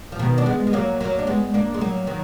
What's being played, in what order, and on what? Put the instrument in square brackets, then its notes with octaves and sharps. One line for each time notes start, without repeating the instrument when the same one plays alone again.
[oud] F3
B2 D#3
D4
G#3 B3
G#3
F#3 A#3
F#3 A#3
D4
G#3 B3
A#3 D4
G#3
F#3 A#3
D#3 F#3